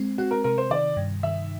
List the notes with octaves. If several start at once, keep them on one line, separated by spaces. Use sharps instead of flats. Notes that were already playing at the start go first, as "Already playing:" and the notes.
Already playing: G#3 C4
C4 F#4
A#4
C3 A#4
C5
D#3 D5
G2
D#3 E5